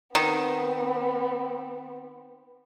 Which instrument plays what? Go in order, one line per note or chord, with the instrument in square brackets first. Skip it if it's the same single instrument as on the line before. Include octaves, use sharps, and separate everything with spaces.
[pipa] D#3 [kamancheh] B3 C4